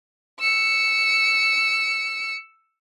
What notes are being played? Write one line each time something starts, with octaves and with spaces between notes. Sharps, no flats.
E6 C#7